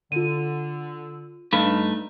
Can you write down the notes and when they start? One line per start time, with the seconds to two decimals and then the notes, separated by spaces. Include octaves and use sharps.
0.12 D3 F4 D#7
1.53 G2 A3 D#4 B4